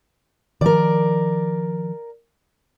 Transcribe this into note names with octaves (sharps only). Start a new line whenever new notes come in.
D#3 F3 A#4 D5